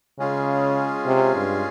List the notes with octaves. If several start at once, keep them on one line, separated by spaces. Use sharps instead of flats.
C#3 G#3 C#4 F4 G#4
C3
G2